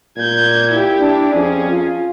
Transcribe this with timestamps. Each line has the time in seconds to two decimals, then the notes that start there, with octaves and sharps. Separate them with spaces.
0.17 A#2 G6 G#6
0.72 E4 G4
1.00 D4
1.35 F2 C#4 G#4
1.70 F4